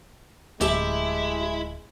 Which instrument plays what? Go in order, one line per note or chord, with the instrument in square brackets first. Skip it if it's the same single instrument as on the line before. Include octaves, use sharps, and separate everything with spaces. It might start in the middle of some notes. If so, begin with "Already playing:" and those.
[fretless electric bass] D1 [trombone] G#3 [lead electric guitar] E4 [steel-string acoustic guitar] G4 E5 A5